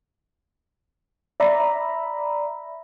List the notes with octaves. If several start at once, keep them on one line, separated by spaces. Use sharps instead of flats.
D5 E5 A#5 B5